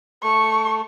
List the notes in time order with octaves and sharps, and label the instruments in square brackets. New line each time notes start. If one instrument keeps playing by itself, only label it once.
[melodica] A3 [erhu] C#6